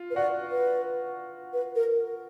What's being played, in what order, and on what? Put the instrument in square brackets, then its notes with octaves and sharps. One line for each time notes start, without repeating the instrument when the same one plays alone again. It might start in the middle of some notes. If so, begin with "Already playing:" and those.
Already playing: [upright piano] F4
[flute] B4
[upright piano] F#4 [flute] D5
[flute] B4
B4
A#4